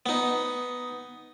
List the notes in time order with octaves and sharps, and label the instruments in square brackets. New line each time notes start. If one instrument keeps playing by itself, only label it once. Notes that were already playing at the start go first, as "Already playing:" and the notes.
[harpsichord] B3 D#4